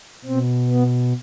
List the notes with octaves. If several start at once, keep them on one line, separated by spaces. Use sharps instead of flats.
B2 C4
B3